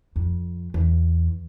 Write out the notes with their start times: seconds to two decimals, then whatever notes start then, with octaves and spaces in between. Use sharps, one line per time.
0.16 F2
0.74 E2